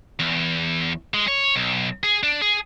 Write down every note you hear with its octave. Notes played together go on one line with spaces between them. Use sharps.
E2
G#3
C#5
B1
G#4
D4
G#4